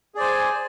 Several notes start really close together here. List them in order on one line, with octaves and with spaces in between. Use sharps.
G#4 D5 C5 G#5